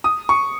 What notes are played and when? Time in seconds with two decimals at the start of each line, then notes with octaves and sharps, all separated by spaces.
0.04 D#6
0.29 C#6